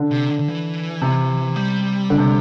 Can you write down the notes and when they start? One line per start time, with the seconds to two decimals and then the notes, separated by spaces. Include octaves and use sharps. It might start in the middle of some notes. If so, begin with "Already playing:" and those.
Already playing: D3
0.11 C3
0.29 D3
0.39 D3
0.48 E3
1.02 C3
1.56 G3
2.10 D3
2.18 C3